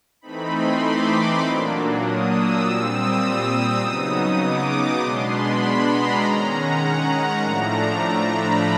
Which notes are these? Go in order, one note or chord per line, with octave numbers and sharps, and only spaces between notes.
E3 A3 C4 D#4 B5
C6
D6
A#2 F#3 A#3 D4
D#6
E6
A#2 G3 C4
D#6
D#6
E6
C#3 F#3 B3 D#4 D#6
D6
B2 G#3 B3 D4 C6
B5
A#5
D#3 G#3 C#4
F#5
F#5
A2 F3 A3 D4 A#5
A#5
B5